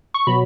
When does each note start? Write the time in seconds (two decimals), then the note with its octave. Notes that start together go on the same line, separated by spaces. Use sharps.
0.14 C#6
0.27 B2 F#3 B5